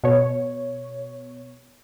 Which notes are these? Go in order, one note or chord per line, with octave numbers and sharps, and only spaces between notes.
B2 C#5